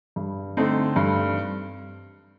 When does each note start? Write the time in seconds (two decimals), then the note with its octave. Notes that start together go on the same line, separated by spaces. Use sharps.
0.16 G2
0.57 D3 A3 C4 D#4
0.96 G2